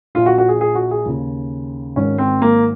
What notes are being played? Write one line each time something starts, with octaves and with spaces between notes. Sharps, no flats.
A#1 A#2 F4
F#4
F#4
G#4
G#4
F#4
G#4
D#2 C#3
G#1 G#2 D#3 C#4
C4
A#3